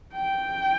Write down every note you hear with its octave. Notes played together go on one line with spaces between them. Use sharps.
G5